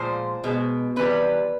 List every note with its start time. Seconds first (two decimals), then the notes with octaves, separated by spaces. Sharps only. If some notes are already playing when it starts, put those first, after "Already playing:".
Already playing: A#2 F3 G#3 C5
0.44 B2 G#3
0.96 C3 E3 G3 B4